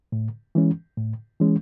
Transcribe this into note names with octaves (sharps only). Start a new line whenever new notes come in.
A2
E3 G#3 C#4
A2
E3 G#3 C#4